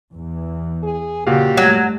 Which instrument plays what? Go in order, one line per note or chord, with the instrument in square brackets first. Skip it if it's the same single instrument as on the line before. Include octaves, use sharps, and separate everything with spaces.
[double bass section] E2 E3
[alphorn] G#4
[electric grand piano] A#2 F#4 F5 [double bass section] C#3 [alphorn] G4
[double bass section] G2 G3 A3 [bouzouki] F#3